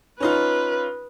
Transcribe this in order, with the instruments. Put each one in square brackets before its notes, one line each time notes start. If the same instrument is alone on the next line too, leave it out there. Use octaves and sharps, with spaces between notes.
[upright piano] C#4 D#4 F4 [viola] B4